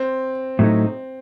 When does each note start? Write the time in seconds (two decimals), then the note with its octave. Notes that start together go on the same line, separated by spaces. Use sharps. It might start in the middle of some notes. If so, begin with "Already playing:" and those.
Already playing: C4
0.59 A2 F#3 A3 D#4